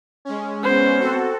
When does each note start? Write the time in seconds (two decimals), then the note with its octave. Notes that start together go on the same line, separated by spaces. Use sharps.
0.25 G#3 C#4
0.63 B3 C5
0.99 C4 F#4 A4